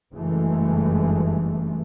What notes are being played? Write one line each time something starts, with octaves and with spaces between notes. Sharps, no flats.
F#1 G2 E3 G#3 A3